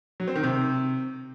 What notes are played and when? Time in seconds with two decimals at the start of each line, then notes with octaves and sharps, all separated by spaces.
0.20 F#3
0.28 C4
0.35 D#3
0.43 C3